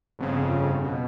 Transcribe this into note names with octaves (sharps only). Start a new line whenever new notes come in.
G1 F2 C#3
B2